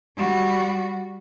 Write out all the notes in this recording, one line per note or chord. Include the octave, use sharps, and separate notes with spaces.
G3 F#4